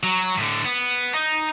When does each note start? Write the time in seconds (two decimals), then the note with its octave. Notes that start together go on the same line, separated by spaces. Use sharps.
0.03 F#3
0.38 A2 D3
0.65 B3
1.14 D#4